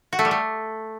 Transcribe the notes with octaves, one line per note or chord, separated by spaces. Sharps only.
F#4
A3
G3
A3